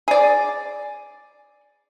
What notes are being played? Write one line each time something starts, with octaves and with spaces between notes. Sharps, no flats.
G#4 D5